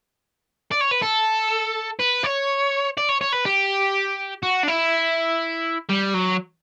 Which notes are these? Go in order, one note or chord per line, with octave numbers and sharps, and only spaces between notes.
D5
C#5
B4
A4
B4
C#5
D5
C#5
C#5
B4
G4
F#4
D4
E4
G3
F#3